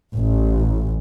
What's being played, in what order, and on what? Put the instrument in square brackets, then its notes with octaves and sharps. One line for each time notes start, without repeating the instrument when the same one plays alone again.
[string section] A1